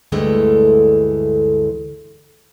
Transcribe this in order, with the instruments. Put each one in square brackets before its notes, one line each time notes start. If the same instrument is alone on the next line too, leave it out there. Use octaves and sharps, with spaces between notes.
[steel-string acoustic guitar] D2 G2 D3 E3 G#3 A3